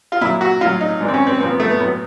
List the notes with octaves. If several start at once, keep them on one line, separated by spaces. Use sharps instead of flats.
F4
A#2 F#3 E4
F#4
A2 F#3 F4
D#4
G#2 E3 D4
C4
C#4
C4
A#2 F3 C4
B3
A3
B3
A2 F#3 B3